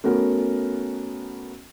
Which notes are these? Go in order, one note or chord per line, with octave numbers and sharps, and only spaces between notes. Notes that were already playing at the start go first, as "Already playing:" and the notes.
A3 B3 C#4 F#4 A#4